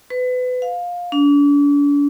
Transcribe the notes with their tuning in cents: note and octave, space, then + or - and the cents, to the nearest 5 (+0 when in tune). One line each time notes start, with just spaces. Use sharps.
B4 +30
F5 +15
D4 -40